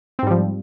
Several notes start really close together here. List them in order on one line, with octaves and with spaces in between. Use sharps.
C4 G#2 G3 F3